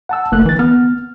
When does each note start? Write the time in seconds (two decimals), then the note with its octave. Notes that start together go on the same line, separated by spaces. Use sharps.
0.09 F#5 A5 E6
0.32 F#1 A3 A#3 F#6
0.45 D3 E3 A6
0.59 B3 F6